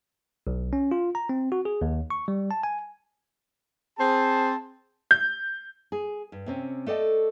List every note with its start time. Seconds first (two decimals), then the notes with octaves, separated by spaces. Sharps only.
0.47 B1
0.73 C#4
0.91 F4
1.15 A#5
1.29 C4
1.52 F#4
1.65 G#4
1.82 D#2
2.10 C#6
2.28 G3
2.51 A5
2.63 G#5
3.98 C4 G#4 C5 A5
5.11 G6
5.92 G#4
6.32 G2
6.46 C3 C4 C#4
6.86 A3 A4 D5 D#5 G5